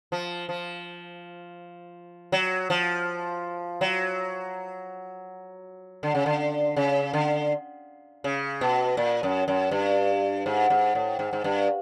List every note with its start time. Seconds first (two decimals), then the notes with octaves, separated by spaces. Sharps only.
0.12 F3
0.49 F3
2.32 F#3
2.70 F3
3.81 F#3
6.03 D3
6.15 C#3
6.26 D3
6.76 C#3
7.13 D3
8.24 C#3
8.61 B2
8.97 A#2
9.23 F#2
9.48 F#2
9.71 G2
10.46 G#2
10.70 G#2
10.95 A2
11.19 G#2
11.33 G#2
11.44 G2